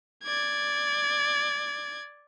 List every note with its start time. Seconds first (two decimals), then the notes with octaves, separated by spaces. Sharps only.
0.24 D5 G#6